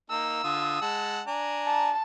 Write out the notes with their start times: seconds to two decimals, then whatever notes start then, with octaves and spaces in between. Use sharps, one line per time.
0.10 A#3 D#4 A#5 E6
0.44 D3 F4 D#6
0.82 G#3 F#5 A5
1.27 D4 G#5 A#5
1.67 A5